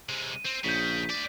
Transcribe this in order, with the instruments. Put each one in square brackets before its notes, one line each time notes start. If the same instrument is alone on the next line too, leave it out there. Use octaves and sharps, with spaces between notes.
[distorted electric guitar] C3 G#3
[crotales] D#7
[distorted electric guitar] C4
[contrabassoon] A#1 [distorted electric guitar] C#3 [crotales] G6 B6
[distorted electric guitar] D2 D5